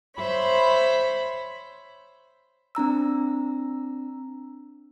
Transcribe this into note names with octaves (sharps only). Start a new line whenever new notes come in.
C5 C#5 E5 B5
C4 D4 A#5 E6